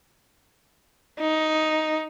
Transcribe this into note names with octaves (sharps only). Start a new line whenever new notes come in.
D#4